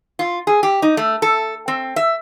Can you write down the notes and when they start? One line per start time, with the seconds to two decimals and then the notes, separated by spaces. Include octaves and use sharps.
0.19 F4
0.47 G#4
0.63 G4
0.82 D#4
0.97 A3
1.22 A4
1.68 C4
1.96 E5